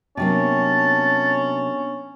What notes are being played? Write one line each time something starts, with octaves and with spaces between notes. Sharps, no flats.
C3 F#3 A#3 B3 C#4 D4 A5